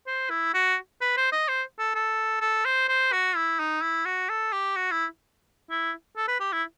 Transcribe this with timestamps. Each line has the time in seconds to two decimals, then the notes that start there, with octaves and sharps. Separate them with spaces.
0.07 C5
0.30 E4
0.54 F#4
1.01 B4
1.17 C5
1.32 D#5
1.48 C5
1.79 A4
1.95 A4
2.41 A4
2.65 C5
2.88 C5
3.12 F#4
3.36 E4
3.59 D#4
3.82 E4
4.05 F#4
4.29 A4
4.52 G4
4.76 F#4
4.91 E4
5.70 E4
6.17 A4
6.28 B4
6.40 G4
6.52 E4